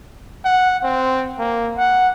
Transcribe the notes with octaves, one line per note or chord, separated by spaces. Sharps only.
F#5
C4
A#3
F#5